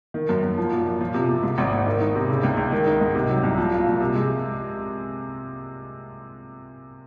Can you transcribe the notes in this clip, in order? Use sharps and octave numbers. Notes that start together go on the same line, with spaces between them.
D#3
F#2
F#2
F3
A#2
A#2
F3
C3
C3
G#2
G#1
G#1
D#3
D#4
C3
C#3
C#2
C#2
D#3
D#4
G#2
C3
F#3
C2
F3
F4
A#2
C3
G#3